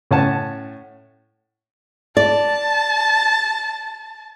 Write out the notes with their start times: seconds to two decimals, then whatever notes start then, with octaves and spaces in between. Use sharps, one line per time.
0.11 A2 C#4 F#5 A5
2.17 D5 A5